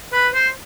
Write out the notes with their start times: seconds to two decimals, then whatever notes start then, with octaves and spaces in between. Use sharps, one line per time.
0.13 B4
0.33 C5